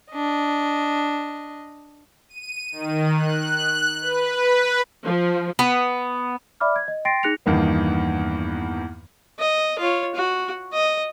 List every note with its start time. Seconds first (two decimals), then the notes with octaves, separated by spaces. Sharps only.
0.12 D4 D#5
2.29 D#7
2.72 D#3
3.14 F#6
4.01 B4
5.04 F3
5.59 B3
6.60 D5 E5 B5 D6 F6
6.76 G#6
6.88 D#5
7.05 G5 C6 A6 A#6 C7 D7
7.23 D#4 G#4 F#6 A#6 C#7 F7
7.46 E2 G2 D#3 A#3 B3
9.39 D#5
9.79 F4 C#5
10.15 F#4
10.73 D#5